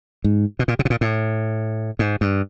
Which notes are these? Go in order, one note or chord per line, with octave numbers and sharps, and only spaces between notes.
G#2
B2
A#2
C3
B2
A#2
A2
G#2
G2